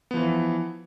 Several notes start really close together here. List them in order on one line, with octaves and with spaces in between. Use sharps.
B3 F3 E3